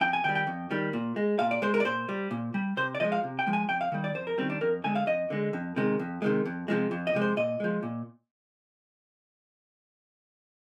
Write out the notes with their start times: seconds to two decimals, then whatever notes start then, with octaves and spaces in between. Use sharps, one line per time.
0.01 F2 G5
0.13 G#5
0.24 D#3 G3 G5
0.35 G5
0.47 F2
0.71 D#3 G3
0.93 A#2
1.16 G#3
1.39 A#2 F5
1.51 D5
1.62 G#3 C5
1.74 A#4
1.80 D5
1.85 A#2 C5
2.09 G3
2.31 A#2
2.54 G3
2.77 C3 C5
2.95 D5
3.00 F3 G#3 D#5
3.12 F5
3.23 C3
3.39 G5
3.47 F3 G#3
3.53 G#5
3.69 F2 G5
3.81 F5
3.92 D#3 G3
4.04 D5
4.14 F2 C5
4.27 A#4
4.38 D#3 G3 C4
4.50 D4
4.61 F2 A#4
4.84 D3 G#3 G#5
4.96 F5
5.06 F2 D#5
5.30 D3 G#3
5.53 F2
5.76 C3 D#3 G#3
5.99 F2
6.22 C3 D#3 G#3
6.45 F2
6.68 C3 F3 G#3
6.91 F2
7.07 D#5
7.14 C3 F3 G#3
7.21 C5
7.37 A#2 D#5
7.60 F3 G#3
7.83 A#2